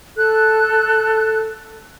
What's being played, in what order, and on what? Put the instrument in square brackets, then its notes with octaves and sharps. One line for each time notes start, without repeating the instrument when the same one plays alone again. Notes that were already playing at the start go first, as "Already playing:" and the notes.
[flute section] A4 F#6